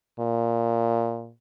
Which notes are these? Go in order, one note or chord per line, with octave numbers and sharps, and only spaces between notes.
A#2